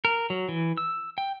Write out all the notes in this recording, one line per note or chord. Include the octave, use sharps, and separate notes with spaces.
A#4
F#3
E3
E6
G5